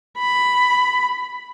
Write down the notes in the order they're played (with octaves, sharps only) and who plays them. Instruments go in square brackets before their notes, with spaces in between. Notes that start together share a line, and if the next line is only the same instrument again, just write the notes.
[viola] B5